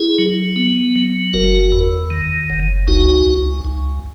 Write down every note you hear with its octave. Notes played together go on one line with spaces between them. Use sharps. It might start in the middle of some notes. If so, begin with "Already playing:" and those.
Already playing: E4 G#4
F#3
B3
F#3
F#1 F#4 A#4
E2
D#3
F#1
C#2 D#4 F#4
C#2
C#2